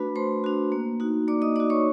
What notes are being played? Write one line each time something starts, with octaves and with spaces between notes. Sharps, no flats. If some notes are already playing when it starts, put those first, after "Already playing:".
Already playing: A3 D4 F#4 B4 B5
A3 C5 C6
D4 F#4
A#3
D#4 F#4
A#3 D5 D6
D#5 D#6
D#4 F#4 D5 D6
C#5 C#6